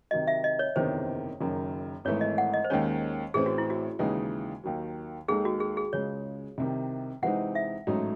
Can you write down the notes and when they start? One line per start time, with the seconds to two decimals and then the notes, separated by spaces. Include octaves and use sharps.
0.11 C3 D#3 F#3 D#5
0.28 E5
0.44 D#5
0.59 C#5
0.76 F#1 E2 C3 D#3 C5
1.41 F#1 F#2 D#3
2.05 G#1 G#2 E3 A3 C#5
2.21 D#5
2.38 F#5
2.54 D#5
2.64 C5
2.70 D#2 D#3 G#3 C#4 C#5
3.34 A1 A2 E3 C4 G#4
3.46 F#4
3.58 E4
3.70 F#4
3.99 D#2 C#3 E3 G#3 D#4
4.64 D#2 D#3 F#3
5.28 D#2 D#3 G#3 D#4 G#4 A4
5.45 F#4
5.60 G#4
5.77 G#4
5.93 C#2 C#3 G#3 C#5
6.58 C2 C3 D#3
7.22 C3 E3 G#3 C4 D#4 F#5
7.55 E5
7.87 A1 G#2 F#3 A3 D#4